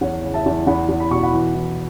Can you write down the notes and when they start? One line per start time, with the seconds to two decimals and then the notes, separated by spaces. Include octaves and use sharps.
0.01 E2 C#5 F#5
0.24 C#3
0.34 E5 A5
0.46 E2
0.67 E2 F#5 B5
0.89 E2
1.00 B5
1.11 B2 C#6
1.23 F#5 B5
1.33 E3
1.55 E3